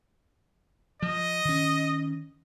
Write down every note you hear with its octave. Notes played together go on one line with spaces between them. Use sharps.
F3 D#5
D#3 C#4